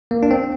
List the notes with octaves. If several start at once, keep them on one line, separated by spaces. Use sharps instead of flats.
A#3
D4
C4